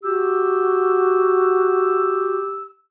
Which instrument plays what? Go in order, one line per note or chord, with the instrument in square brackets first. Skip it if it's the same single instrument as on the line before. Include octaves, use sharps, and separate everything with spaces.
[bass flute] F#4 [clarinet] G4 [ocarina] E6